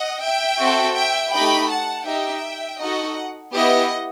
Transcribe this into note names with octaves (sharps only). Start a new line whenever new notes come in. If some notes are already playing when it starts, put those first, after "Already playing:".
Already playing: D#5 F#5
E5 G5
C4 F#4 A4
E5 G5
A3 D#4 G4 G5 B5
F#5 A5
D#4 G4 E5 G5
D#4 F#4 A4 D#5 F#5
B3 E4 G4 D#5 F#5